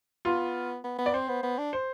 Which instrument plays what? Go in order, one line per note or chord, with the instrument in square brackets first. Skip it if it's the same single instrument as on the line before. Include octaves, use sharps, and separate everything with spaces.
[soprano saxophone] B3 [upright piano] F4
[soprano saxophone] B3
B3
[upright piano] D5
[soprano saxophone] C4 [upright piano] C5
[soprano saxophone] B3
B3
D4
[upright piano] C5